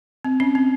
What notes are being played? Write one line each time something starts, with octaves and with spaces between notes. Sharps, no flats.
C4
C#4
C4